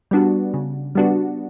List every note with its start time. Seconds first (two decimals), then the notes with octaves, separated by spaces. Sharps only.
0.11 G3 B3 D4 F#4
0.54 C#3
0.95 G3 B3 D4 F#4